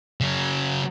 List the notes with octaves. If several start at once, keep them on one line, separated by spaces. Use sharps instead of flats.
C#3 F#3